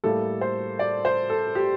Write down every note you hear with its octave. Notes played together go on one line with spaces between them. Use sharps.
A2 G3 A#3 A4
C5
D5
C5
A4
G4